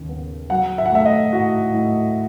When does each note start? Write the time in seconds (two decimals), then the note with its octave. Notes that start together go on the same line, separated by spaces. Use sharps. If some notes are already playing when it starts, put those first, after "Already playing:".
Already playing: D#2 C#3
0.09 B3
0.50 F#3 F#5
0.78 E5
0.86 F#5
0.92 A3 E5
1.05 D#5
1.33 A2 F#4
1.74 A2